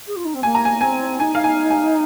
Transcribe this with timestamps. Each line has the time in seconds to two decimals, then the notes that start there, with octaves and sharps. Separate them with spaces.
0.07 G#4
0.16 F4
0.25 D#4
0.34 C4
0.43 A#3 G#5
0.55 A#5
0.65 G#5
0.81 C4 G#5
1.19 D#4 G#5
1.35 F5
1.44 G#5
1.70 G#5